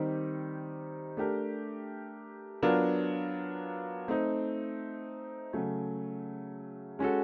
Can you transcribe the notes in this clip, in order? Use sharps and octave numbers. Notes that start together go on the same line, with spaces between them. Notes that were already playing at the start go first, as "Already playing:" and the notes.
Already playing: D#3 G3 C4 D#4 G4
A3 D4 G4 A#4
F#3 B3 D4 F4 A#4
A3 C4 D#4
C#3 F#3 A3
G#3 C#4 F#4 A4